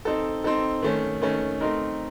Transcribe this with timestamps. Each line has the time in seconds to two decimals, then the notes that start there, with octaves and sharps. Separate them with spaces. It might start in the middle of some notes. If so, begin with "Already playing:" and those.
0.05 C4 D#4 A4
0.44 C4 D#4 A4
0.82 D#3 A3 C#4
1.22 D#3 A3 C#4
1.61 A3 C4 D#4 A#4